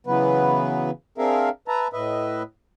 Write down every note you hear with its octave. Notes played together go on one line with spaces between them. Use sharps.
C#3 E3 F#3 B3 B4
C4 D4 G#4 A#4 E5 F5
B4 E5 A5 A#5
A2 B4 D#5 E5